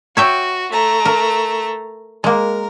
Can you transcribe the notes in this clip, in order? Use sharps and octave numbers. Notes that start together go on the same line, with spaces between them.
F#4 C#5 E5 G5
A3 A#5
A#4
G#3 A#3 A#4